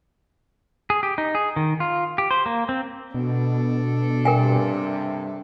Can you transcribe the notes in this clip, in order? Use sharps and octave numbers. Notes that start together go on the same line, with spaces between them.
G#4
G4
D#4
G#4
D#3
F4
G4
C5
A#3
C4
B2 D4 A4
G2 C3 A#4 G5 G#5